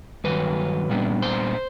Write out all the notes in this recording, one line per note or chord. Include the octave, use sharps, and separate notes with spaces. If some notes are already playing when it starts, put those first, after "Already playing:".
G2 D#3 F#3 B4
A#2 G3 B3 D4
C5